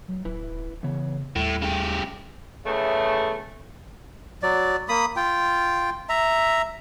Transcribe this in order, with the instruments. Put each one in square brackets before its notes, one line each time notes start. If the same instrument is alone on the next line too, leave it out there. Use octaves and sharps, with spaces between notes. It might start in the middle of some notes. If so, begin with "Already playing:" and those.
[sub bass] F#3
[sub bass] D1 [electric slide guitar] E4 B4
[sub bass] C#3 [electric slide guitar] E3 B3 C#5
[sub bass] D#2 [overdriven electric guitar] A2 [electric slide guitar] G3 A3 E4
[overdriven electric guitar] C#3 G4
[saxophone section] E2 C#3 A3
[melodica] F#3 D5
A#3 B5 D#6
F4 G5
E5 A#5